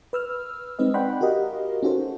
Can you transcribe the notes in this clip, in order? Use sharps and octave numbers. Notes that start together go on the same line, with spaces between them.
B4 E6 F6
G#3 C4 D#4 B4 D#5
D5 F#5 G5 B5 C6 F#6
F#4 G4 A#4 D#5 F5
C#4 D#4 F#4 A4 C5